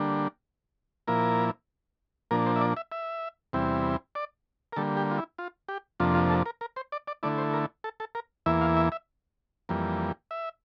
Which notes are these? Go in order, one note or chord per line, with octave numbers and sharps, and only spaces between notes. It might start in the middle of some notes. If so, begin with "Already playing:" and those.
Already playing: D3 G3 A#3 D4
A#2 F3 A#3 E4 A#4
A#2 F3 A#3 D4 A#4
C5
E5
D5
E5
E5
E2 C3 G3 C4 E4
D5
A#4
D3 G3 A#3 A4
G4
F4
E4
F4
G4
F2 C3 F3 A#3 D4 F4
F4
A4
A#4
A#4
C5
D5
D5
D3 A3 E4 D5
C5
A#4
A4
A4
A#4
E2 E3 A#3 E4 E5
F5
E5
E5
F2 E3 G3 A#3
E5